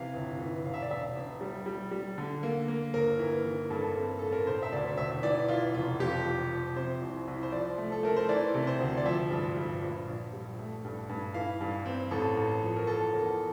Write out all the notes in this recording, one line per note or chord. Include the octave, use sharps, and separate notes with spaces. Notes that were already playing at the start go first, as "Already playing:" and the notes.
Already playing: C3 E3 F5
G1
E3
E1 F5
E5
D5
E1 E5
E1
G3
G3
G3
D3
A#3
A#3
G1 A#4
E3
E3
G2 A4
A#4
C4 A4
A1 A4
A#4
E1 C5
E5
D2 D5
E1 E5
E3 D5
E3 F4
F1 F4
F2 G4
F2
F3
C3 C5
C2
C2
C5
F3 D5
A3
A4
A3 A#4
C5
E3 D5
C3
C5
D2
D5
F3 E5
G2
G2
A#1
A#1
G3
A3
G2
G2
E3 F5
G2
C4
A1 A4
A1
F3
A#4
E2 A4
E2 A#4